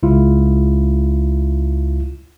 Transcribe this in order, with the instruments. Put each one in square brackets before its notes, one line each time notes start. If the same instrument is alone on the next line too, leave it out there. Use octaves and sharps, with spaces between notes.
[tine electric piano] C#2 E4 F4